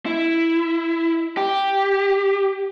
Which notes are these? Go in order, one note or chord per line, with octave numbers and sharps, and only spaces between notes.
E4
G4